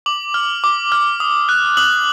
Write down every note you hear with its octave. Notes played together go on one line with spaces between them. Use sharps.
D6 F#7
F6
D6
F6
D#6
F#6
D#6 F#7